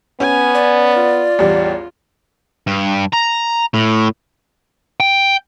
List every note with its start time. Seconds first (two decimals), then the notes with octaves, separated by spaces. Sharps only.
0.20 B3 C#4 G#5
0.55 D5
0.96 F4
1.39 A1 E2 G3
2.67 G2
3.13 A#5
3.74 A2
5.00 G5